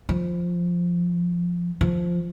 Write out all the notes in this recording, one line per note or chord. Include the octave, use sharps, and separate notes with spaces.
F3
F3